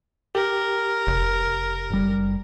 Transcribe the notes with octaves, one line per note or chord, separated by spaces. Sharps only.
G4 A#4
F1
F#1 G3